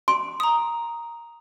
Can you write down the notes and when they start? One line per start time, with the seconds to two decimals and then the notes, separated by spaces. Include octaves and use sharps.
0.08 C6 D7
0.40 A#5 D#6